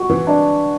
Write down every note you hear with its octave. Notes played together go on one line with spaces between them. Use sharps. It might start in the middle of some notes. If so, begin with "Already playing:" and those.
Already playing: F#4
E3
D4